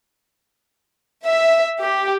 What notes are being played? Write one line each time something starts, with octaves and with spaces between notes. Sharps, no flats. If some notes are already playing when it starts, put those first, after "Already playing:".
E5
G4